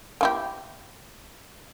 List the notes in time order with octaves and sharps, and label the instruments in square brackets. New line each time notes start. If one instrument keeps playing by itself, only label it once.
[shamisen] A#3 E4 G4